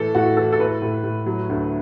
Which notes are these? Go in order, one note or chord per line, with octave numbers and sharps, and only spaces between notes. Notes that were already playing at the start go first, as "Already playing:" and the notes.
Already playing: A2 E3 A4
A2 F#4
E3 A4
A4
A2 B4
A2
A2
F#3
D2